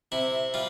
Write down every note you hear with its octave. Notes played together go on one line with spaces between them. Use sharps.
C3 E4
G3 F4